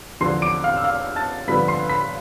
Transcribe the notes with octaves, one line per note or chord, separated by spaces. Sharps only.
E2 D3 F3 C6 C7
D6 D7
F5 F6
E6
F5 F6
A5 A6
G2 D3 F3 B3 B5 B6
C6 C7
B5 B6